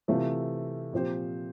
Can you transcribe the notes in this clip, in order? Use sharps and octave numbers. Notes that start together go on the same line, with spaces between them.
C3 E3 A3 C4 F4
A#2 F3 C4 G4 C5